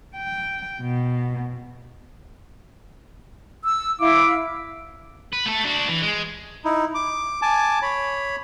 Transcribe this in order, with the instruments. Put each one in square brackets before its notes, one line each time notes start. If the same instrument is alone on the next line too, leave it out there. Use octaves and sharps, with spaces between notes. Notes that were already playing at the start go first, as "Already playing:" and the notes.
[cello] G5
B2
[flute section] E6
[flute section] E4 F5 E6 [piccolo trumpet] D6
[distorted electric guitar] B4
A3 A4
D4 F#4
E3
G#3
[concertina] D#4 E4
D6
G#5 A5 D6
C#5 B5